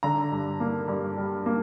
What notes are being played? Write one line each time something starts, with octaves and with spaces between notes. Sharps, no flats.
D3 A#5
G2
A#3
G2
G3
A#3